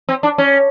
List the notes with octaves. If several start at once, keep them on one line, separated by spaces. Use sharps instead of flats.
C4
D4
C#4